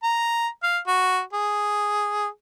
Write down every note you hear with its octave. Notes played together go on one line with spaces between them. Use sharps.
A#5
F5
F#4
G#4